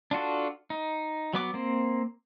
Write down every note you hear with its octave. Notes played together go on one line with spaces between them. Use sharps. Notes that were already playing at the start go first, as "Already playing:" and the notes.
D4 F4 F#4 A4
D#4
F#3 B3 D6
A#3 C4